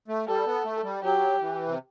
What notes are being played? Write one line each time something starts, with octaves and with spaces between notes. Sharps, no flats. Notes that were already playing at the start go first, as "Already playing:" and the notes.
A3
G3 A4
B3
A3
G3
F#3 G4
E3
C3